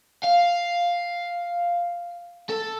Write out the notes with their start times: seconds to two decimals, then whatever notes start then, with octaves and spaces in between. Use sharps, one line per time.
0.24 F5
2.50 A4